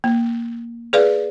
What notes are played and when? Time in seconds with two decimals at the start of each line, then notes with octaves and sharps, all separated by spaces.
0.04 A#3
0.93 G#4 B4 D5 F5